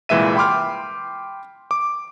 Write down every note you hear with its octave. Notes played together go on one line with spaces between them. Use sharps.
C2 A#2 E3 G#3 E5 D#7
G5 B5 C6 D6 F6
D6